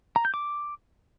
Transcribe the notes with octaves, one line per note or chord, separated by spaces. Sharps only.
A#5
G6
D6